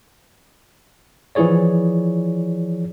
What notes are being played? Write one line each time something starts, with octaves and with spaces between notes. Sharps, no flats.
E3 F3 E4 G#4 C#5 D5